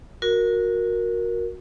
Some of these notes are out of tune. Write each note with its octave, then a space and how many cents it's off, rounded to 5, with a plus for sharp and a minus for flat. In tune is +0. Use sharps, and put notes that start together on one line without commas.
F#4 -20 A#4 +0